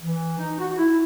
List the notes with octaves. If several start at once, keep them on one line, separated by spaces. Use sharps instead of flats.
E3
D#4
F#4
F#4
E4